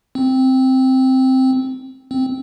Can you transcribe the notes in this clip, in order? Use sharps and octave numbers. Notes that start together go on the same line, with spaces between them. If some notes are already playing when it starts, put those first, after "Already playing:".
C4
C4